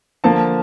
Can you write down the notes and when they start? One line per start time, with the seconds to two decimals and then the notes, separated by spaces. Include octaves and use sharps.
0.24 D3 F3 A#3 A5